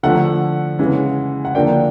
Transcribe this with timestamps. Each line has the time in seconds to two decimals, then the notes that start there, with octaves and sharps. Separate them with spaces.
0.03 D3 F3 A3 F#5
0.79 C#3 E3 G#3
1.45 F#5
1.55 D3 F3 A#3 D4 G5